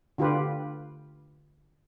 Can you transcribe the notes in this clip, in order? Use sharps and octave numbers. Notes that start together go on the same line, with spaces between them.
D3 F4 G4 B4